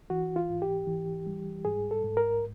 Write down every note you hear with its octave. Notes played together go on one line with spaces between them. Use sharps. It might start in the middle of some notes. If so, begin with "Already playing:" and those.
E3 F#4
F4
G#2
G4
E3
G3
G#2 G#4
A4
G#2
A#4